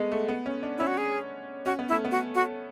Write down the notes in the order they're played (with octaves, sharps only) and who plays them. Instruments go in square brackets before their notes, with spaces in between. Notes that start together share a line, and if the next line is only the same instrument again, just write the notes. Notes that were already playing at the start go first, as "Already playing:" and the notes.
Already playing: [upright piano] G#3 A3 B3
A3
B3
C#4
D4
[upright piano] C#4 [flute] E4
[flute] F#4
G#4
[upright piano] C#4 [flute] F#4
[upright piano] B3
[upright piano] A3 [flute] E4
[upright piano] B3
[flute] F#4
F#4